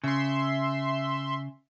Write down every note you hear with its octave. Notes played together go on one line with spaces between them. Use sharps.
C#3 E5 C6